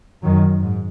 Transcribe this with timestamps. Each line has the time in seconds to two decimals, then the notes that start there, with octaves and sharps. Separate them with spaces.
0.22 F#2 D#3 F#3
0.61 G#2